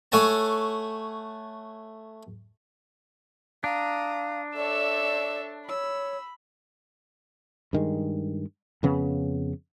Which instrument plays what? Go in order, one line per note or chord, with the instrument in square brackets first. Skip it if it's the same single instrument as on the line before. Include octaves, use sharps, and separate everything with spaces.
[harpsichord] A3 A4 C#5 F#5 G#5 A5
[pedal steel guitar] D4 [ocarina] F5 [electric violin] A#5 D#6
[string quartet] A4 E5 E6 [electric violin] C#5 A5 [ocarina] D5
[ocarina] C#5 [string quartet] B5 [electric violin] E6
[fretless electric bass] G2 D#3 G#3
F2 C#3 B3